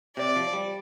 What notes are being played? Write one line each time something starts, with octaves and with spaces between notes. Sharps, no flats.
C3 D5
F3
G3